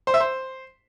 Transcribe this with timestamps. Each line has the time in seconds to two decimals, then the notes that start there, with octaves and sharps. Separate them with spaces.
0.07 C5
0.14 E5
0.20 C5